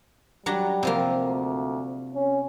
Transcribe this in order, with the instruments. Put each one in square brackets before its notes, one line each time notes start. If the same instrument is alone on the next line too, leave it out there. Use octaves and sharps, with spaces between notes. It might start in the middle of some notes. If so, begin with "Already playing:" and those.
[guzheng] F#3 D4 A#5 [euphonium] G3
[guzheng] C3 F3 A#3
[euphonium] D2
C#4